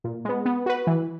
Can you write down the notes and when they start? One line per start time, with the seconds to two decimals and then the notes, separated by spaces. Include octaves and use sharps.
0.04 A#2
0.25 G#3 B3
0.45 B3
0.66 F#4 B4
0.87 E3